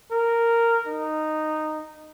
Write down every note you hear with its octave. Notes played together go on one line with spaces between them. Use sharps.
A#4
D#4